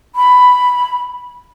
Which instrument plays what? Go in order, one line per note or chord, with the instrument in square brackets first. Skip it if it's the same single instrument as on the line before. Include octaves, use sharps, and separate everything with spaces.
[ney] B5